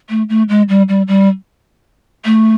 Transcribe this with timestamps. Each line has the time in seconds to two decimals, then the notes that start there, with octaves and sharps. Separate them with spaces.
0.10 A3
0.29 A3
0.49 G#3
0.69 G3
0.89 G3
1.08 G3
2.25 A3